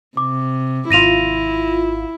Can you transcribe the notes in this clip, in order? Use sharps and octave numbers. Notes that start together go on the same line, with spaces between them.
C3 D6
G#1 E4 F4 A#6 D#7 F7